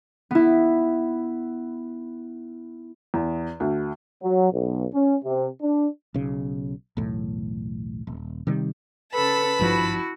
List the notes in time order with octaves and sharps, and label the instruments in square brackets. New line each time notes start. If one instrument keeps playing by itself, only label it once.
[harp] B3 E4
[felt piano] E2
D2
[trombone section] F#3
B1
C#4
C3
D4
[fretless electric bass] B1 C#3
B1 E2 A2
D#1
C3 D#3 G3
[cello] C#3 A4 [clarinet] B4 [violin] A5 B5
[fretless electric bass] G#1 G2 F3 [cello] E4 F#4